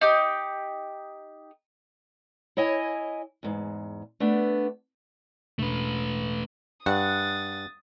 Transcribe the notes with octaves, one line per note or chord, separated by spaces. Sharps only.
D#4 G4
E4 C#5 D#5 G#5
E2 G#2
A3 B3 D4
E1 A3 B4
G2 F#5 D#6 A6